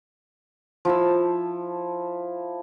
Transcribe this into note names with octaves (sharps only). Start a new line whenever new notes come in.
F3 E4 E6